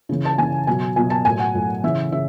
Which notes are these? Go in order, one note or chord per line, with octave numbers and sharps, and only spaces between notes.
C#3 E3
A5
C#3 E3 G#5
B2 F#3 G#5
B2 F#3 G#5
A5
A2 F#3 G#5
F#5
A2 F#3
C#3 E3 E5
C#3 E5